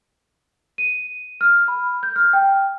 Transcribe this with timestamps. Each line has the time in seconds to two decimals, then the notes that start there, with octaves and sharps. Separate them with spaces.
0.78 D#7
1.41 F6
1.68 B5
2.03 G6
2.16 F6
2.33 G5